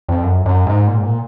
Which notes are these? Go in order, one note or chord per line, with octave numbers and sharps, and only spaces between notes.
F2
F#2
F#2
G#2
A#2
G#2
A#2